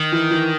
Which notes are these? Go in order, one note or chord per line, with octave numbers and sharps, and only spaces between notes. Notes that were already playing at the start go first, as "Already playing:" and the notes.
Already playing: D#3
E3
E3